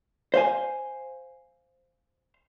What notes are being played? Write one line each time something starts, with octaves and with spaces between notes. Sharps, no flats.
C5 F5 G#5